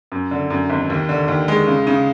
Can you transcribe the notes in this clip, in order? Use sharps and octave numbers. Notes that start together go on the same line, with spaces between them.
F#2
D3
F#2
G#1
D#2
D3
D#2
G#3
C#3
C#3